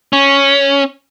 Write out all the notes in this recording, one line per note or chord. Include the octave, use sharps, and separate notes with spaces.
C#4